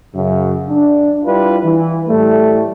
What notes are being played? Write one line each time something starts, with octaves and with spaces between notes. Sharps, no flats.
F#2 C#3
D4
G3 D4 E4 F4 B4
E3
A2 G3 A3